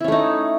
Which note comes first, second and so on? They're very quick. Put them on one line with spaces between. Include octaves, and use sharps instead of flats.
E4 C#4 A3 D#4